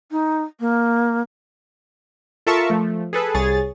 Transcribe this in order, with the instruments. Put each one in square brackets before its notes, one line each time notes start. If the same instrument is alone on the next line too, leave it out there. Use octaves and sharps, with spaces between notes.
[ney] D#4
A#3
[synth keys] F4 A4 A#4 E5 A5 C#6
F3 A3
G#4 A4 B4
C2 G#4 C#5 A6